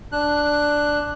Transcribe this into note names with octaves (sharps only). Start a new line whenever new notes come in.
D4 F#6